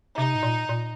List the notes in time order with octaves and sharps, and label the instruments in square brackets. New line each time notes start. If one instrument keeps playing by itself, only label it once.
[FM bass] C3 [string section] D#4
[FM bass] A2
A#2
A#2